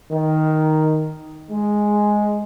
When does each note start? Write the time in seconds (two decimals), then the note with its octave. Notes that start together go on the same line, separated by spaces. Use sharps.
0.11 D#3
1.50 G#3